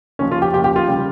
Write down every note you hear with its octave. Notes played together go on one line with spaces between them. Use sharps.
D#2 C#3 F3 C#4
F4
G4
D#2 C#3 F3 G4
G4
F4
C#3 G3